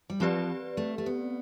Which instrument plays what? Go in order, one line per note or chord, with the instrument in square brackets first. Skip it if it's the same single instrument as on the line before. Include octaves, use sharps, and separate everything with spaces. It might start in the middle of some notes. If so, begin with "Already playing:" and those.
[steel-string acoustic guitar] G3
[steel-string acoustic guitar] F3 [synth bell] C4 G4 B4 D5
[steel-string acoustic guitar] A3
A3
B3